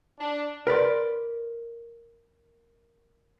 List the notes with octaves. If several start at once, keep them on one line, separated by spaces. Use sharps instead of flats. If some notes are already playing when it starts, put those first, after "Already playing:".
D4
A#4 B4 D5 C6